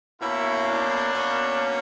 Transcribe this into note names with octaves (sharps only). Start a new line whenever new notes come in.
B2 A#3 C#4 E4
D4
B2 A#3 C#4